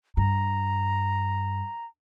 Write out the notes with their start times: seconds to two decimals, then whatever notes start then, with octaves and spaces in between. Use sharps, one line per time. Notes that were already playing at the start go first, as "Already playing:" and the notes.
0.17 G2 A#5